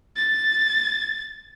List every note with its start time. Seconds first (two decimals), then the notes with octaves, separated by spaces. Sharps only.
0.16 A6